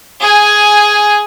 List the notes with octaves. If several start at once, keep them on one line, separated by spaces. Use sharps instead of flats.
G#4 G#5